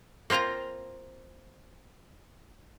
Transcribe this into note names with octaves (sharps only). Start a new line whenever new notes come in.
A#3 C4 F4 F5 A#5